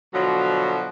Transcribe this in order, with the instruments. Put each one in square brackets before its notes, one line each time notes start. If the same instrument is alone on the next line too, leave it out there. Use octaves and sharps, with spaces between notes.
[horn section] B2 D3 F3 F#3